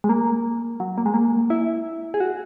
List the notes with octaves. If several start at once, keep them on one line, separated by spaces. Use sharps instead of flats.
G#3
A#3
F#3
A#3
G#3
A#3
E4
G#4
F#4